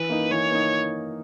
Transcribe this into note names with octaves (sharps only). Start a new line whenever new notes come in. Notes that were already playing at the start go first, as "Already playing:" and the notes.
Already playing: E3 B4
A#3 D#4
E3 C#5
A#3 D#4